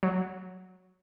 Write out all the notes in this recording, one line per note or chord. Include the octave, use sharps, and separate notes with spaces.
F#3